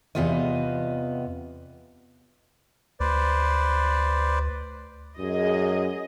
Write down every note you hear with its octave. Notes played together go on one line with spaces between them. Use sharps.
E2 C3 B3 F4 D#5
D2 B4 C5 D5
F#2 G#4 D#5